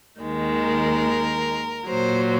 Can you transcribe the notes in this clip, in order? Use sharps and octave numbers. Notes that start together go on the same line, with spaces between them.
D#2 D#3 G#3
A#4
A#2 F#3 C5